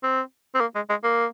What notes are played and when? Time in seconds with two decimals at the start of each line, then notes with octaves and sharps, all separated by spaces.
0.03 C4
0.55 C4
0.60 A#3
0.75 G#3
0.89 G#3
1.04 A#3